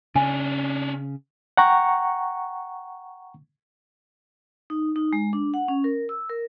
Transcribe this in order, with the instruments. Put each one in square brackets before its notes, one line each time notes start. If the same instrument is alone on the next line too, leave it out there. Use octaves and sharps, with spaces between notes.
[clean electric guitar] C#3 [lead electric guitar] C#4 D4 [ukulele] G#5
[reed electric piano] F#5 G5 A#5 C#6
[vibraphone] D#4
D#4
G#3
D4
F#5
C#4
A#4
E6
A#4